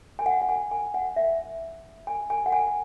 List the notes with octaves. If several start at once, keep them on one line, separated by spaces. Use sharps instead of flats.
G#5
F#5
F#5
G#5
G#5
F#5
E5
G#5
G#5
F#5
G#5